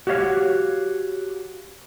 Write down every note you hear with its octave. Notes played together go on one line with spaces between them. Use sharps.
F#4 G4 C#5 D#5 F5